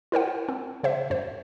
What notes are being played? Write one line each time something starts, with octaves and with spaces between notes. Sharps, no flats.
E4 A#4 C5 F#5
C4
C#3 C5 E5
F#2 C5